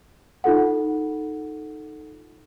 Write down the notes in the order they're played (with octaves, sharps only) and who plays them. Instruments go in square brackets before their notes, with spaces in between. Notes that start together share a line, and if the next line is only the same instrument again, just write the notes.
[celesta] D#4 F4 A4 F#5